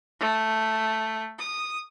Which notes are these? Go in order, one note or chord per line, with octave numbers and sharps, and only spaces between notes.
A3
D#6